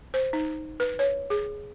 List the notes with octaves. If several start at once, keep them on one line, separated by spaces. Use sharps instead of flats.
C5
D#4
B4
C#5
G#4